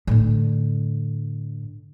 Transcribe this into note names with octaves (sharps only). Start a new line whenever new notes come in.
A2 D3